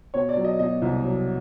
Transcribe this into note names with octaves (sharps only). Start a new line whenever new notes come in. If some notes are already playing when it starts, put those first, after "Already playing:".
B2 C#5
D5
F#3
D#5
B2 D#5
C2
F#3